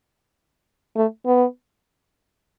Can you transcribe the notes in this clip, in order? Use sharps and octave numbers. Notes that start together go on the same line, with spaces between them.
A3
B3